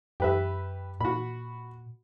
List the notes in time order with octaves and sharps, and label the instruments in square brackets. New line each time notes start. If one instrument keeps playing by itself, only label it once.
[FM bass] F#2 [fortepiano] G4 B4 E5
[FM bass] A#2 [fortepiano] F#4 B5